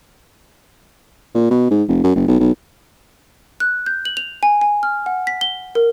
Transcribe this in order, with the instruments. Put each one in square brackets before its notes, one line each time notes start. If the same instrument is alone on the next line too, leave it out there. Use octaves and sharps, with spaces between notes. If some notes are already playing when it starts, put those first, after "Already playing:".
[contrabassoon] A#2
B2
G#2
F1
F#2
F#1
B1
B1
[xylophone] F#6
G6
F#7
F7
G#5
G#5
F6
F#5
B6
G7
A#4